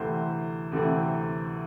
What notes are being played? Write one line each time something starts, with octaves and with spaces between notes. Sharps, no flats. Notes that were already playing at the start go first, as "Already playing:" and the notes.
Already playing: D2 C3 E3 A3 C4 C5
D2 C3 E3 A3 C4